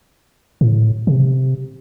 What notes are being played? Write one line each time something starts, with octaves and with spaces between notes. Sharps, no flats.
A2
C3